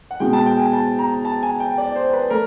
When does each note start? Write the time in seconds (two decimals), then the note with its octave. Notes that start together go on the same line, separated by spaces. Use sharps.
0.11 F#5
0.20 B2 G#3 G5
0.33 A5
0.46 G5
0.59 G#5
0.73 A5
0.99 A#5
1.25 A5
1.43 G#5
1.60 G5
1.78 D5
1.95 C5
2.13 B4
2.30 A3 A#4